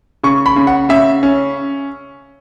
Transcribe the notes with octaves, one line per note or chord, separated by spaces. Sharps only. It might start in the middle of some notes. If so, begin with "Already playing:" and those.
C#3 C#6
B5
C#3
F#5
C#3 E5
C#4